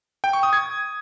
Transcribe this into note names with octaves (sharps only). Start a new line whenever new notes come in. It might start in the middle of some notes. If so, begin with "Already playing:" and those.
G5
C#6
D#6
G#6